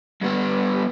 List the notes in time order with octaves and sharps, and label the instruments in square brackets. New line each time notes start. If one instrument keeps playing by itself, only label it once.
[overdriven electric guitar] G2 B3